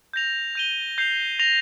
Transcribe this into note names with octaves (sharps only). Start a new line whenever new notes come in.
G6 A#6 F7
G6 D#7 G7
G6 C7 F7
A#6 F7